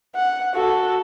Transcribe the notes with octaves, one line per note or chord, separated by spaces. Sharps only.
F#5
F#4 A4